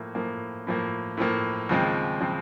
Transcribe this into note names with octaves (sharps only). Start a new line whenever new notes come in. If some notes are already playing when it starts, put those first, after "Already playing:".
Already playing: A2 F3 A#3
A2 F3 A#3
A2 F3 A#3
A2 F3 A#3
D#2 C#3 F3 G#3 C4
C#3 F3 G#3 C4